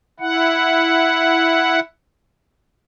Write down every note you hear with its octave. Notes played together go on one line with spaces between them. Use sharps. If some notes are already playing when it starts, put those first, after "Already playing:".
E4 F#5